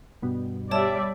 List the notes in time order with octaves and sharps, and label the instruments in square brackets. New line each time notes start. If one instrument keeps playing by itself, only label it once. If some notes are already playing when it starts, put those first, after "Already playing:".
[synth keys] G2 B2
[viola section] G3 D5 E5 [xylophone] C#5 A5